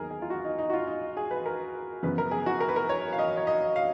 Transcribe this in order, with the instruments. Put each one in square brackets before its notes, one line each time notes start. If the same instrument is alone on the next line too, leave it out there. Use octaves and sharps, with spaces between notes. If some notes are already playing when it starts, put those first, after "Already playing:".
Already playing: [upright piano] D#2 D#3 F#3 B3 D#4 G#4 A#4
G#4
F4
F#4
D#4
D#4
F#4
F4
D#4
G#4
B4
A#4
F#2 C#3 F3 B3 B4
A#4
G#4
F#4
A#4
B4
A#4
C#5
F5
D#5
C#5
D#5
F5